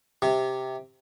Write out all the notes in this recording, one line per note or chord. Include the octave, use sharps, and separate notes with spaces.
C3